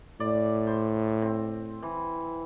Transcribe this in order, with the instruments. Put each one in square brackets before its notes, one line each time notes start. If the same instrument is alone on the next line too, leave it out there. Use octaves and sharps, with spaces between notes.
[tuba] A2 [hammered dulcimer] D5
[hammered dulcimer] C5
C4
E3